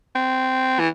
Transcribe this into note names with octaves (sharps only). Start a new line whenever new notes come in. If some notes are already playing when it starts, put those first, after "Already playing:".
C4
E3